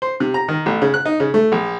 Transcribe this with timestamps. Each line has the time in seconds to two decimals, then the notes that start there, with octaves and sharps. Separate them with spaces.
0.02 C5
0.20 C3
0.34 A#5
0.48 D#3
0.66 A1
0.82 C#3
0.94 F#6
1.06 D#4
1.20 C#3
1.34 A3
1.52 A#1